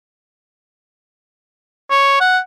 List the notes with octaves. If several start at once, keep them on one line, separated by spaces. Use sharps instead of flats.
C#5
F#5